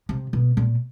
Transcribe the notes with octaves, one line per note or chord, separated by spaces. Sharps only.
C3
B2
A#2